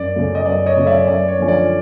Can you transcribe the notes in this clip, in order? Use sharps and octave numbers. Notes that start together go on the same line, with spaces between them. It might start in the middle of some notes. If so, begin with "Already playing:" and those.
Already playing: F#2 D5
C#3 F#3 A3
D#5
F#2 D5
C#5 D#5
C#3 F#3 A3
D5 E5
F#2 D5
C#5
D3 F3 A3 C#4
D5